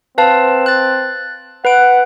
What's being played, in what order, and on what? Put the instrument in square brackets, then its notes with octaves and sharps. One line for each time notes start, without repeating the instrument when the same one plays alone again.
[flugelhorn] C4 [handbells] B4 F5 A5
[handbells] F#6 A6
[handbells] B4 B5 D7 [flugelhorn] F#5